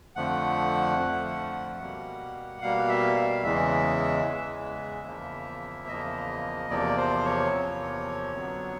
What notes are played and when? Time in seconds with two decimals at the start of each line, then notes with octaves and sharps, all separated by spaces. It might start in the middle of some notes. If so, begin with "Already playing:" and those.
0.16 F2 D3 F3 A3 F#5
0.98 F2 D3 F3 A3
1.80 B2 G3 A#3
2.61 B2 G3 A#3 F5
2.89 E5
3.16 F5
3.43 E2 C#3 E3 G#3 E5
4.24 E2 C#3 E3 G#3
5.07 E2 C#3 F3 A#3
5.88 E2 C#3 F3 A#3 D#5
6.70 E2 C3 F3 A#3 D5
6.97 C5
7.25 C#5
7.51 E2 C3 F3 A#3
8.33 F2 D3 F#3 B3